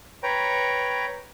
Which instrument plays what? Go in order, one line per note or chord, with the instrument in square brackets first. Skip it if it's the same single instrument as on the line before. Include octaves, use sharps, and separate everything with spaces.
[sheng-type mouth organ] B4 C#5 G5 A#5